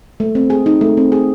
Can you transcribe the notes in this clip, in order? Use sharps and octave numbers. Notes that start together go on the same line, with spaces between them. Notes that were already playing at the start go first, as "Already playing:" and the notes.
A3
C4
G#4
D#4
A3
C4
G#4